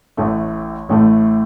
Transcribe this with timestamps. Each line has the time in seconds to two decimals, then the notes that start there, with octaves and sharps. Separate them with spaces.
0.17 A1 A2 A3
0.89 A1 A2 A3